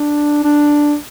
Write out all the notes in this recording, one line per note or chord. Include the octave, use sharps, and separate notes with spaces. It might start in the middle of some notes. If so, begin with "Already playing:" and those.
Already playing: D4
D4